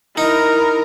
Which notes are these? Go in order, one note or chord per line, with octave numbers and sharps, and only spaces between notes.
D#4 E4 A#4